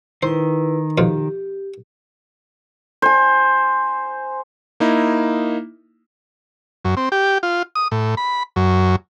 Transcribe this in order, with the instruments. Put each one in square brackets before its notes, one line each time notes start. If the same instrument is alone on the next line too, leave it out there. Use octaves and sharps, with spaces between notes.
[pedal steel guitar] D#3 [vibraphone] E4 B4 [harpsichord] C5
[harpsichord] F2 B2 F4 [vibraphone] G4
[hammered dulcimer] C5 G#5
[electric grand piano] A#3 D#4 E4
[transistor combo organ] F#2
C4
G4
F4
D#6
A2
B5
F#2